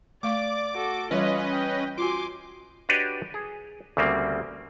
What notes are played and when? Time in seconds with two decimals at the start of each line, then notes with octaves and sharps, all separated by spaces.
0.23 A3 D5 F5 C#6 D6
0.75 F#4 A4
1.11 E3 G3 C#4 F4 B4 C#5 D#5
1.52 G5
1.98 F4 F#4 G#5 C6 D6
2.89 D4 F#4 G4 B4 C#5 D#5
3.34 G#4
3.97 D2 C#3 G3 A#3 C4